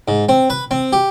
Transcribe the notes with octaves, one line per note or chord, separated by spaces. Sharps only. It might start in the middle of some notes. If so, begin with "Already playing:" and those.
G#2
C4
B4
C4
G4